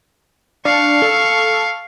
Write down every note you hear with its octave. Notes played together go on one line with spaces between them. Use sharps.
D4 F5 C#6
A4